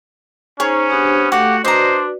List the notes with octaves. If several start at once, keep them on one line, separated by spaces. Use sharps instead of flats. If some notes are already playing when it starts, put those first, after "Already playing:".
C#4 D#4 G#4 C5 C#5 A#5
B3 D4 G4 C5
A3 F#4 G4 A4 F5 F#5
D4 F#4 B4 C5 D5 D#5 A#5